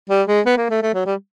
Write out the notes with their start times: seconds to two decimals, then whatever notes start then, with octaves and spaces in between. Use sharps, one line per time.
0.10 G3
0.28 G#3
0.46 B3
0.57 A#3
0.70 A3
0.82 A3
0.94 F#3
1.06 G3